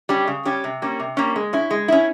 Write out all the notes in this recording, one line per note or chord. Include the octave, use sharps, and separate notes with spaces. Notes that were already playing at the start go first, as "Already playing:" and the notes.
G3 C#4 G4
C#3
G3 C#4 G4
C3
G3 A#3 C#4
C3
G3 A#3 C#4
G#3
C#4 E4
G#3
C#4 E4